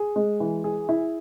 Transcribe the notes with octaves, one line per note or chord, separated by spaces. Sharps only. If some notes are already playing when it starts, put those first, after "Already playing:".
Already playing: G#4
G#3
E3
G#4
E4